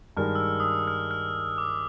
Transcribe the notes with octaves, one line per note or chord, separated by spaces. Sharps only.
G2 D#3 G#3 F6
E6
F6
D#6
E6
F6
F6
D6